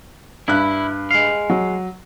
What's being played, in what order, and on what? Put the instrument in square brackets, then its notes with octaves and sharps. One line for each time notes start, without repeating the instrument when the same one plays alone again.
[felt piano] G2 F#6 [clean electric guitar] E4
[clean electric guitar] G#3 F5
[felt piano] F#3